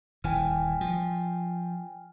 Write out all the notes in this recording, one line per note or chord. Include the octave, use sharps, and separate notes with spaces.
D#1 E3 G5 G#5 F6
F3